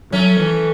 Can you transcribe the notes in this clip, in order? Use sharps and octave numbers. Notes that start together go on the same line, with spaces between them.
F#3 A3 C#4
E3